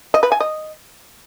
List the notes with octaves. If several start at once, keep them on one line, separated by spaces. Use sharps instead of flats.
D#5
B4
G#5
D#5